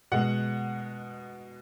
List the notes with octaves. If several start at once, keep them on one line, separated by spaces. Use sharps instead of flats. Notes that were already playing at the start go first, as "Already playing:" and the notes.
B2 G#3 F#5